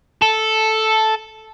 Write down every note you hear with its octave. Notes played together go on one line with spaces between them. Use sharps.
A4